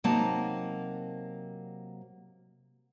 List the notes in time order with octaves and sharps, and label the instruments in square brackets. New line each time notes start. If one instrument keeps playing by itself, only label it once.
[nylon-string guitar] C3 F#3 A#3 C4 D#4 A5